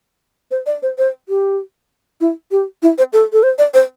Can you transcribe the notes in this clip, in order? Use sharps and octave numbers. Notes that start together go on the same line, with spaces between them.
C5
D5
C5
C5
G4
E4
G4
E4
C5
A4
A4
C5
D5
C5